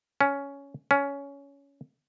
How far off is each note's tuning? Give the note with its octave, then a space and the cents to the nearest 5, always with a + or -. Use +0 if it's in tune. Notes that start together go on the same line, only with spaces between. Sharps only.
C#4 +10
C#4 +15